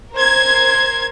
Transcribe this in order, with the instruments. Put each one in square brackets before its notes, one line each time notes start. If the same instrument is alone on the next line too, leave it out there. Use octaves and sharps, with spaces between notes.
[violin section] A#4 C5 G#6